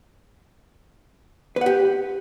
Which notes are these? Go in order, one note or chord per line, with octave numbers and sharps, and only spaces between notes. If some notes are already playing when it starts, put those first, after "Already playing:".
G4 B4 F#5